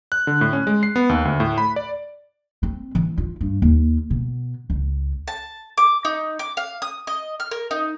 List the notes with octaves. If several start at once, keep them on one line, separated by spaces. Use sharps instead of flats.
F#6
D3
A2
C#4
G#3
C7
B3
D#2
D2
A2
B5
D5
C4
E3
F4
G2
D#2
B2
C#2
A5
D6
D#4
D6
F5
D#6
D#5
F6
A#4
D#4